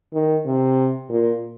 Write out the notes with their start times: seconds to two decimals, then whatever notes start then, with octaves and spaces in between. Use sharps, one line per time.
0.13 D#3
0.46 C3
1.09 A#2